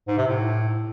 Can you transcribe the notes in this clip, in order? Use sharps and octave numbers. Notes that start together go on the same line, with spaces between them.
G#2
C3
A2